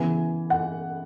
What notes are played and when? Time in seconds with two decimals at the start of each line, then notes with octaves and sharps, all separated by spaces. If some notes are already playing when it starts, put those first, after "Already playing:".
Already playing: C#3 E3 B3 G#5
0.50 F#5